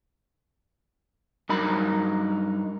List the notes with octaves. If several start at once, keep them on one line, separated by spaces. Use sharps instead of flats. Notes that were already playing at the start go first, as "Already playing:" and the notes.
G2 F#3 D#4 A#4 B5